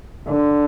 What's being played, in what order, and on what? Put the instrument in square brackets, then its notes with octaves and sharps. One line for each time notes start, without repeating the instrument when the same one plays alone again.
[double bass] D3